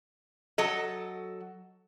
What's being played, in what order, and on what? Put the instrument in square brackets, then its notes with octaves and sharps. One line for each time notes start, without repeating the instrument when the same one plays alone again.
[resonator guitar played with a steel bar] F#3 A4 D#5